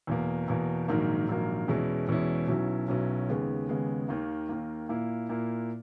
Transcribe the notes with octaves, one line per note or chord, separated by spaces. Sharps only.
E2 B2 A#3
E2 B2 A#3
A#1 G#2 D#3 F#3 A#3
A#1 G#2 D#3 F#3 A#3
E2 B2 G#3 C#4 E4
E2 B2 G#3 C#4 E4
B1 B2 F#3 C#4 E4
B1 B2 F#3 C#4 E4
D#2 C#3 G#3 B3
D#2 C#3 G#3 B3
D#2 D#3 A#3
D#2 D#3 A#3
A#2 A#3 E4
A#2 A#3 E4